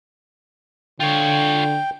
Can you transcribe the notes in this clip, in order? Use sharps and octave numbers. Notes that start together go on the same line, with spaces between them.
D3 F4 C#5 G5